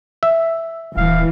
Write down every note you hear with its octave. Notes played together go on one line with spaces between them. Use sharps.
E5
D#1 E3 F5